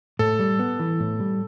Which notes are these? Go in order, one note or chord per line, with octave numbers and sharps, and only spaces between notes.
A2 A4
G3
B3
E3
A2
G3